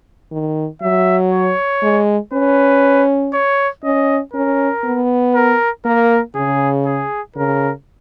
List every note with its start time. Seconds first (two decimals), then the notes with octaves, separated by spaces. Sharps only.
0.32 D#3
0.82 F#3 E5
1.32 C#5
1.83 G#3
2.33 C#4 B4
3.33 C#5
3.84 C#4 D#5
4.34 C#4 A#4
4.84 B3
5.35 A#4
5.85 A#3 A#4
6.35 C#3 G#4
6.86 G#4
7.36 C#3 A#4